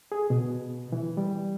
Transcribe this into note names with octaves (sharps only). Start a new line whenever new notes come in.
G#4
B2
E3
G3